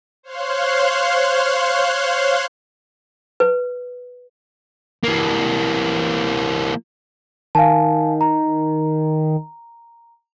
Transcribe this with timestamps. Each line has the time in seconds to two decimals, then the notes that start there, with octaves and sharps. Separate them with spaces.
0.23 C5 C#5 F5 C6 F#6
3.40 B4
5.03 E3 A#3
7.55 D#3 F5 G#5 A5
8.21 A#5